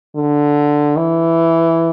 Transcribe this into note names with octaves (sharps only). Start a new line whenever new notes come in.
D3
E3